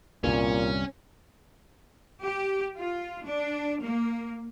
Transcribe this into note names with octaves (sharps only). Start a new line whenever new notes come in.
C2 G2 A#2 C#4
G4
F4
D4
A#3